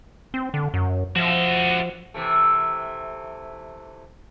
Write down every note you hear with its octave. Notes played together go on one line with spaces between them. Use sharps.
C4
D3
F#2
F3 F#4 E5
C3 E3 A3